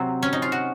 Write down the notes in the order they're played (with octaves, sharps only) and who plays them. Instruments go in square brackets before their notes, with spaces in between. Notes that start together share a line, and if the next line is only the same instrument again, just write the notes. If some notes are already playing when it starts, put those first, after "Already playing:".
Already playing: [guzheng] C3 F#3 C4
C#4
D#4
F4
F#4